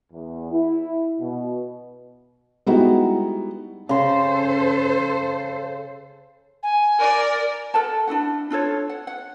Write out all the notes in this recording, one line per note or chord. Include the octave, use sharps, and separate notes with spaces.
E2
E4
B2
G3 G#3 B3 D#4 E4 F#4
C#3 A4 C5 C6
G#5
A#4 D5
A4 A#4 F#5 A5
D4 E4 F#4 F#5
D4 F4 A4 C#5
F#5
F#5